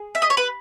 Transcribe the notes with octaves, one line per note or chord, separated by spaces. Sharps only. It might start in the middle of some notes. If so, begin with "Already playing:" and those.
Already playing: G#4
E5
D#5
C#5
B4